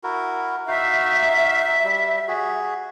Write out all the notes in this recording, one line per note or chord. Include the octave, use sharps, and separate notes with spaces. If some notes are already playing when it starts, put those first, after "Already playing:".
E4 F#4 A#4
D#4 F#4 E5 F5
G3
F#4 G#4